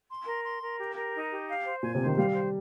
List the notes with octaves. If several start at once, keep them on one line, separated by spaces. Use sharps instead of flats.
C6
A#4
C6
A#4
G4
A#4
D#4
G4
F5
C5
A#2 G#5
C3
C5
D#3
G3 F5
C5